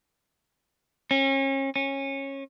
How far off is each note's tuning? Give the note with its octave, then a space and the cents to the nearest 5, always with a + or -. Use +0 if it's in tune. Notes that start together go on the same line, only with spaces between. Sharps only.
C#4 -35
C#4 -20